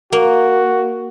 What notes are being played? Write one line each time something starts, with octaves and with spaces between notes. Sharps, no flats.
A#3 F#4